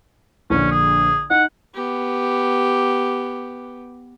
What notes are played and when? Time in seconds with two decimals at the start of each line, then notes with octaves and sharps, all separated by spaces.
0.50 A#1 D3 C#4
0.71 G#4
1.30 D#4 F#5
1.74 B3 G4